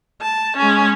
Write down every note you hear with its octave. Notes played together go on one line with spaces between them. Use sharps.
A5
G#3 C#4